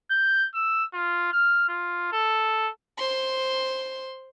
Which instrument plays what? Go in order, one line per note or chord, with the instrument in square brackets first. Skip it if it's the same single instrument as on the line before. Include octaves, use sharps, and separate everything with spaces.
[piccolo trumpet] G6
E6
F4
F6
F4
A4
[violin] C5 C6